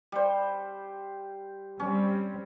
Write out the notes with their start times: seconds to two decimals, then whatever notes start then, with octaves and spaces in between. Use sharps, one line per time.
0.12 G3 C5
1.80 G3 C4 C#4